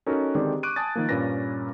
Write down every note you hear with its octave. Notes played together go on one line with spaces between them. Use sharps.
C#4 D#4 F#4 A4 A#4
D3 D#3 G#3 C4 G4 D5
C#6 D6 F#6 D7 D#7
G#5 A5 D#6 G#6 A6
D#3 F3 A#3
G2 A#2 A#3 C#4 B4 A#6